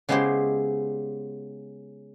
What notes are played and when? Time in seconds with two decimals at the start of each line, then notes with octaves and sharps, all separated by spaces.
0.09 C#3 G#3 B3 E4 G4 C5